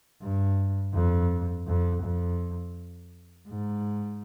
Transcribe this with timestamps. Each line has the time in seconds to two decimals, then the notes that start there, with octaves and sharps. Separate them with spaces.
0.22 G2
0.94 F2
1.67 F2
2.02 F2
3.48 G#2